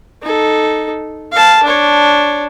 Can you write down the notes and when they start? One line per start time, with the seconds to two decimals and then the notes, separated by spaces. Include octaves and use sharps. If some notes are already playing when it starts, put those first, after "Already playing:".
0.22 D#4 A4
1.32 F5 A5
1.64 D4 C#5